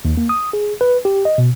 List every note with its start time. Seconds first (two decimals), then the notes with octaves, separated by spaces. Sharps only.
0.05 D#2
0.17 A#3
0.29 D#6
0.53 G#4
0.81 B4
1.05 G4
1.25 D#5
1.38 B2